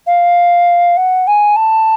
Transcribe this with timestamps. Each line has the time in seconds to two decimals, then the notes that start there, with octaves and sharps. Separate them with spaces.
0.07 F5
0.97 F#5
1.27 G#5
1.56 A5